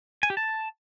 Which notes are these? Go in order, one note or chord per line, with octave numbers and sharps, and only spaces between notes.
G#5
G4
A5